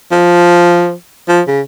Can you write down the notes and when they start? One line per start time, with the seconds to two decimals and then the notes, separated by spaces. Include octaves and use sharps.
0.11 F3
1.28 F3
1.47 C#3